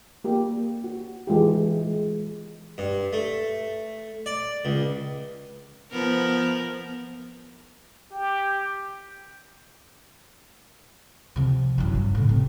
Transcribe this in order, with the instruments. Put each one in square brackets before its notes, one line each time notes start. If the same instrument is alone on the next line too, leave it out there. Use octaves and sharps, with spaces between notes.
[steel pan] A#3 G4
F#4
E3 G#3 F4 G4
G#3
[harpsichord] G2
A3
D5
C#2
[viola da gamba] F3 B3 A#4
[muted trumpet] G4
[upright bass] C3 F3
F#2 E3
G2
A2 C#3
C3